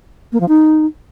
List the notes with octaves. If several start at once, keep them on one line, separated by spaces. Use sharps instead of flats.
A#3
F3
D#4